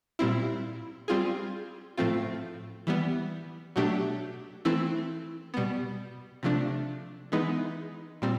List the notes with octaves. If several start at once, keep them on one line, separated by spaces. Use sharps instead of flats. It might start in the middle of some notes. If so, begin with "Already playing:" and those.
A#2 G3 C4 E4
G3 C4 F4 G#4
A2 F3 A3 C4 F4
E3 G3 B3
B2 F#3 A3 D4 G4
E3 A3 C4 E4
B2 G3 B3
C3 F3 A3 D4
E3 G#3 B3 D#4
A#2 G3 C4